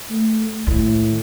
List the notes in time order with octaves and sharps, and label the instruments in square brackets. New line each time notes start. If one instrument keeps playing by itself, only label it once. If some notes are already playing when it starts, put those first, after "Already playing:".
[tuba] A3
[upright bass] D#2 [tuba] A2